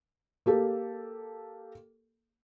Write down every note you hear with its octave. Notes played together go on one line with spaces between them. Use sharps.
A#3 G4 A4